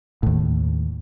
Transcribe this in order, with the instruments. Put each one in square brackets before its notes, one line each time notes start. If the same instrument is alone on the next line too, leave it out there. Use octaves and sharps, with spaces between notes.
[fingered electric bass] D#2 A2